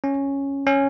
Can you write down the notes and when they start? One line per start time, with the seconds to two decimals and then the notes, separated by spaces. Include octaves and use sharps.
0.04 C#4
0.67 C#4